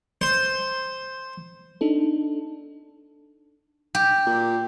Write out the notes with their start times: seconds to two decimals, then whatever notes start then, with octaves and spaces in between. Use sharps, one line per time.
0.21 C5
1.81 D4 D#4 A4
3.95 G4
4.26 A#2